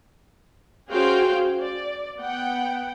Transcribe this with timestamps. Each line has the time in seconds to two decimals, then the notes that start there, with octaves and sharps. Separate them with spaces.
0.91 C#4 F#4 G#4 C5 F5 G5
1.59 D5
2.19 B3 F#5 G5